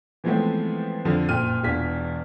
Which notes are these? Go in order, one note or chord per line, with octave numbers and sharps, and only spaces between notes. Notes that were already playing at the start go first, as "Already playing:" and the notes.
E3 F3 G#3 A3 B3 C4
F2 D3 F3
F#1 A#2 G5 F6 D#7
E1 E2 D4 F4 B6